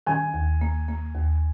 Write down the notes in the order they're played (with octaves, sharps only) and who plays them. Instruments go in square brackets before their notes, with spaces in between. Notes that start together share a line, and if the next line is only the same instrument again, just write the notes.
[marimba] D#3 [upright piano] G#5
[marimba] D#2
A#3
A#3
D#2